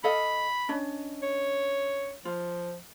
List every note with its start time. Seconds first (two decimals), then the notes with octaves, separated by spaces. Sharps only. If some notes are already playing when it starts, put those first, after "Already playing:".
0.04 A4 D#5 F5 B5
0.69 C#4 D4 D#5
1.23 C#5
2.25 F3 F4